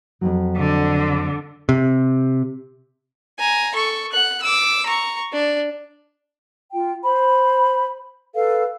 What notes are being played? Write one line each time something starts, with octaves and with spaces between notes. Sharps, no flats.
F2 G#2 F#3
D3
C3
G#5 A#5
A4 C#6
F#5 F#6
D6 E6
A#5 C#6
D4
F4 G5
C5 B5
A4 B4 F5